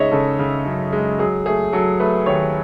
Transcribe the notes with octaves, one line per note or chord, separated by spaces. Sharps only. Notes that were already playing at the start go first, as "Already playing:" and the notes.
Already playing: C#3 G#3 D#4 C#5 D#5 E5
C#3 A4
C#3
F#2
G#3
F#3 G#4
A3 G#4
F#3 A4
A3 B4
D#2 C#5